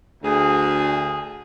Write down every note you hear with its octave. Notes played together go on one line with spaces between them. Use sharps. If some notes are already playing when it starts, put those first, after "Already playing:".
D2 G#4